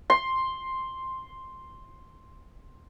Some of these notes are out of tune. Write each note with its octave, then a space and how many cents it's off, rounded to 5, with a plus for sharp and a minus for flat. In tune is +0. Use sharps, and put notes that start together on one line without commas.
C6 +5